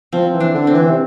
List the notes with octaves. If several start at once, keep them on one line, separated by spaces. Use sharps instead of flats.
F3 C4
E3
D4
D3
C4
E3
C3